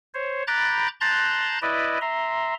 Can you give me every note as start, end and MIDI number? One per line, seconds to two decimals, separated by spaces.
0.14 0.43 72
0.14 0.43 73
0.47 0.88 82
0.47 0.88 83
0.47 0.88 86
0.47 0.88 90
0.47 0.88 91
0.47 0.88 93
1.01 1.58 81
1.01 1.58 82
1.01 1.58 84
1.01 1.58 90
1.01 1.58 91
1.01 1.58 93
1.62 1.98 64
1.62 1.98 71
1.62 1.98 74
1.62 1.98 75
2.01 2.54 76
2.01 2.54 82
2.01 2.54 84